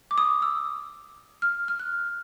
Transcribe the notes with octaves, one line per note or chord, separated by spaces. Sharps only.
D6
D#6
E6
F6
F6
F#6